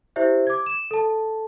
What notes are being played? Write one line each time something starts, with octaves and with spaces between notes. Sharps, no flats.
E4 G4 C5 D5 E5
D6 G#6
E7
A4 A5